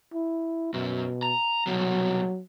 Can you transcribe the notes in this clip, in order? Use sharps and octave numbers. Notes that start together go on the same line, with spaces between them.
E4
F#2 B2
A#5
C2 B2 F#3